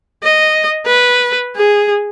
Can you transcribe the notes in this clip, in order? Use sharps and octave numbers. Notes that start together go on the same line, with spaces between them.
D#5
B4
G#4